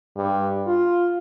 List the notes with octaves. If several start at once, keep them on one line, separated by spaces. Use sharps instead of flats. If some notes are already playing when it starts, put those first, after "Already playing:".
G2
F4